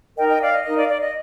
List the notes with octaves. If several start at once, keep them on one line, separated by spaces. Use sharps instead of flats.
D#4 A#4 D#5 G5
D#5 G5
D5 F5
D#5
D#4 A#4 D#5
D5 F5
D5
D#5